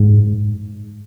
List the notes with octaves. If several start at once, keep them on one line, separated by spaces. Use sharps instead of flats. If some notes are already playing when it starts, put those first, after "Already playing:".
Already playing: G#2